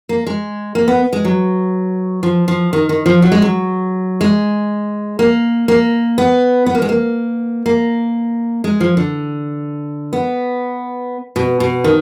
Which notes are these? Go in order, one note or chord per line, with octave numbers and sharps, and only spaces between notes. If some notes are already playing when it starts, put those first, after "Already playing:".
A#3
G#3
A#3
B3
G#3
F#3
F3
F3
D#3
D#3
F3
F#3
G#3
F#3
G#3
A#3
A#3
B3
B3
A#3
G#3
A#3
A#3
G#3
F3
D3
B3
B2
B2
D#3